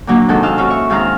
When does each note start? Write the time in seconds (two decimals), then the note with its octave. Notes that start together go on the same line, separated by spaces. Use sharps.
0.07 A#2 D3 F#3 A#3
0.29 C3 D#3 G#3 D#4 F#4 A4
0.43 D#5 F5 E6
0.58 C#4 F4 F#4
0.70 E5 C#6
0.90 G#2 D#3 C4 F5 A#5 F6